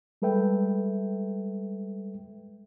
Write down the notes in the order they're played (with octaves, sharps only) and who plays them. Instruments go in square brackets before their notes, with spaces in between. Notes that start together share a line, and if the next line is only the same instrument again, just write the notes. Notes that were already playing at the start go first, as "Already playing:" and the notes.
[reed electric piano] G3 G#3 A4 B4 E5 G5